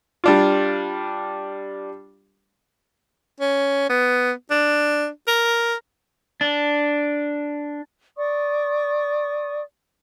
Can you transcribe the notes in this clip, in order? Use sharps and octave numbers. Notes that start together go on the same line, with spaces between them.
G3 D4 F4
C#4
B3
D4
A#4
D4
D5 C#6 D#6